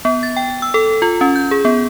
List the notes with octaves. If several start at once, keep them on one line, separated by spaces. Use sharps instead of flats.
B3
A6
G5
E6
A4
F4
C#4
G6
G#4
B3